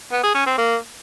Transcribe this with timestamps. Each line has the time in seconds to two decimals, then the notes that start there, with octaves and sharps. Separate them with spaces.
0.12 B3
0.23 G#4
0.35 C#4
0.46 C4
0.58 A#3